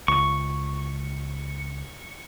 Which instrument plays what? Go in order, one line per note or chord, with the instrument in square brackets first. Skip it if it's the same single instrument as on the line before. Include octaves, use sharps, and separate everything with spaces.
[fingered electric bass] C#2 [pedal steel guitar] C#6